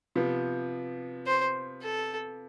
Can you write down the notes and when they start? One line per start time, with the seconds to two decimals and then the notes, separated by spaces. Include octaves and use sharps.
0.16 C3 F3 B3
1.26 C5
1.82 A4